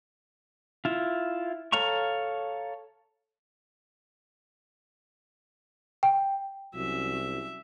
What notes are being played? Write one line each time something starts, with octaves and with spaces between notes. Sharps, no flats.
E4 F4
A4 C#5 F5 A#5 C#6
G5
C2 F#3 C#4 E5